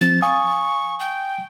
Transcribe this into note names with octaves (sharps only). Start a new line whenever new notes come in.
F3 C4 A6
F5 G#5 C#6 D#6
G5